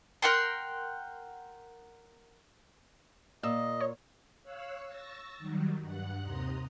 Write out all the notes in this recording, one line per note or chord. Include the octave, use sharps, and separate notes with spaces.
A#4 F#5 G5 C6
A#2 D#5 E6
C#5
C#5 F5 E6 F#6
C#6 E6 A6 A#6
D#3 F#3 G3
G2 F#5 F#6
D#2 C3 A#5 C6 D#6